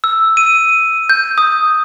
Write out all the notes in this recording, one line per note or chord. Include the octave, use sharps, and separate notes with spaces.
E6
D#7
G6
D#6